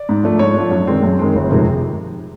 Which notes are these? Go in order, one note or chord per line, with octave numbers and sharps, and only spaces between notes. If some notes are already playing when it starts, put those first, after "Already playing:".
Already playing: D5
G#2
F3 A3 D4
G#2 C#5
F3 A3 D4
F#2
D#3 G#3 C4
F#2
D#3 G#3 C4
G1
F2 C3 D#3 G#3